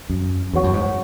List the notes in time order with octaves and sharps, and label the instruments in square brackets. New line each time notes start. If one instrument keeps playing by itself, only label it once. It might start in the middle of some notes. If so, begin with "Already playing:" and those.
[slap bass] F#2
[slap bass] E2 [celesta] F#4 C#5 F#5 C#6
[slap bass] F#2
G#2